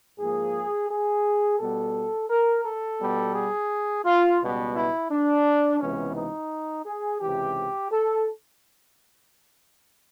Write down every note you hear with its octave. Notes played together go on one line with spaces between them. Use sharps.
G#2 F3 A#3 G#4
G#4
B2 G3 B3 A4
A#4
A4
B2 G3 B3
G#4
F4
C#2 B2 G3 B3
E4
D4
C#2 C3 E3 G#3 B3 C#4
D#4
G#4
C#2 C3 E3 G4
A4